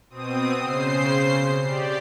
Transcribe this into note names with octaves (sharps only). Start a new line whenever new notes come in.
B2 C4 D#6
C#3 C5 C7
G4 D5